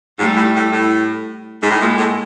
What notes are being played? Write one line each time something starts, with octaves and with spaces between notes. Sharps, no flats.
G#2 G3 A3
A2
A2
A2
G#2
A2
A#2 G#3 A#3
A2